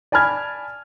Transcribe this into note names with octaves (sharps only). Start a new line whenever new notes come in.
D5 G#5 A5 B5 F6 G#6